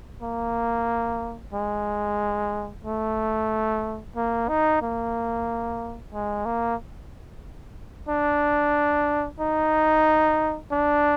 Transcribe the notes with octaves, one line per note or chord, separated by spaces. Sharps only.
A#3
G#3
A3
A#3
D#4
A#3
G#3
A#3
D4
D#4
D4